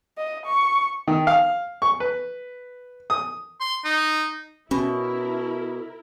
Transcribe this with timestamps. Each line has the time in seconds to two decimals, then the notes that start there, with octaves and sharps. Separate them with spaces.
0.18 D#5
0.46 C#6
1.08 D#3
1.27 F5
1.82 C#6
2.00 B4
3.10 D#6
3.61 C6
3.85 D#4
4.71 B2 C#4 E4 A#4